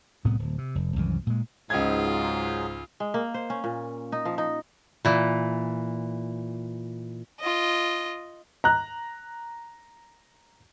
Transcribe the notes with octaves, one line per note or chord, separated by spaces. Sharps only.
C2 A2 C3 B3
D1
C3
F1
C2 F#2 D#3 E3
A#2 G#3
C#2 G#2 F#3 F4 G#4 G#6
G#3
A#3
C5
C#4
A#2
D#4
F3
D#4
A#2 E3
F4 D#5
A#5 F#6